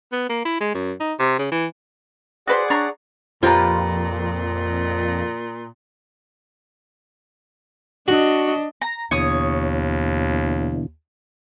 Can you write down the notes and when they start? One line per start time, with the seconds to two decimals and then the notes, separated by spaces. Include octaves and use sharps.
0.12 B3
0.30 A#3
0.45 E4
0.61 G#3
0.75 F#2
1.00 D#4
1.20 C3
1.39 C#3
1.52 E3
2.47 F#4 G#4 B4 C5 D5 F#5
2.70 D4 C#5 A#5
3.43 F2 A#2 F4 G4 B4 C5 A#5
8.08 D4 F#4 D#5
8.82 A#5
9.11 D#2 B2 D3 E3 C#5 D#6